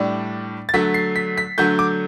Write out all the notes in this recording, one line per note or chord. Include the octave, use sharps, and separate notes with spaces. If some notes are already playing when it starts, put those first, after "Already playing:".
Already playing: A2 G3 D4
A6
D3 F#3 A3 B6
C7
B6
B6
D3 F#3 A3 G6
D6